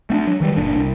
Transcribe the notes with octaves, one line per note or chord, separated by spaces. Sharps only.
A3 B3 D4
F#3
D#3 E3 G3
F#1 A#2 D4
C2